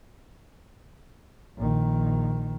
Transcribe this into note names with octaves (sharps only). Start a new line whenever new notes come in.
A#1 D#3